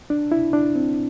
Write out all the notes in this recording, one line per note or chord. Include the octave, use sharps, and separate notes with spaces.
D4
E4
D4
C4